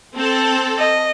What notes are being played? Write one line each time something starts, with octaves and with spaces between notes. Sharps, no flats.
C4 A4
D#5